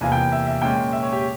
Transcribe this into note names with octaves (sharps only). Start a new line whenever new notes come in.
E2 C3 E3 A#3 F4 G#5
G5
E5
E5
A#2 G#3 C#4 G5
E5
C#5
G4